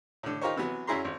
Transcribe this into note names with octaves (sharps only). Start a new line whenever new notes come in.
A2 D3
D#4 F4 G4 A#4 C5 C#5
C3 E3 F#3 B3
F#2 C#4 E4 G#4 A#5 C6
G#1